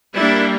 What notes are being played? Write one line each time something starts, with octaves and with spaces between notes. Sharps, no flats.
G3 A#3 D4 E4